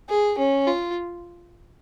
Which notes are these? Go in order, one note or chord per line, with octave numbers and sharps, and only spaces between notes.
G#4
C#4
F4